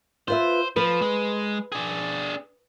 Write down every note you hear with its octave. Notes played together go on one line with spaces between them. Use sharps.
F4 B4 C5 E5
F3 B4
G#3
D4 G#4